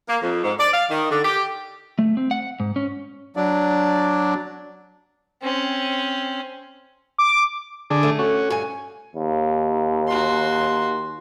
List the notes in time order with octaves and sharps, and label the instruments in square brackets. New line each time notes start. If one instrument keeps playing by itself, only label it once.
[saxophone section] A#3
F2
G#2
D5
F5
D#3
D3
G4
[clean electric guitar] A3
C4
F#5
G#2
C#4
[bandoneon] F#3 D4 D5
[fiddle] C4 C#4
[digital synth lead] D6
[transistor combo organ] D3 D4 G#4
[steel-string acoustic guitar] A3
[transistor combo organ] C#4 F#4
[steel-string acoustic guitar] G2 G#5
[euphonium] D#2
[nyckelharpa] F#4 C6